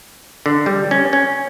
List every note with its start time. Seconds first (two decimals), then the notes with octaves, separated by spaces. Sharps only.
0.46 D3
0.66 G3
0.91 C#4
1.13 C#4